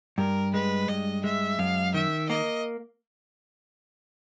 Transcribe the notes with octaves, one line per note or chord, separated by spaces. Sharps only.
G2 A#4
G#3 B4
G2 D#5
G#3 E5
F#2 F5
D#3 E5
A#3 D#5